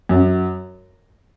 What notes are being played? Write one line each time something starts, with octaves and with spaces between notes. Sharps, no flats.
F#2